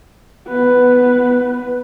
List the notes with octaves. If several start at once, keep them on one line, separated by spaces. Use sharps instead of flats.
B3 B4